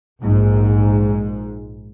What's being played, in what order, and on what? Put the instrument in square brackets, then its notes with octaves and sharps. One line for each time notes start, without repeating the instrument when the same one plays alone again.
[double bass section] A#1 G#2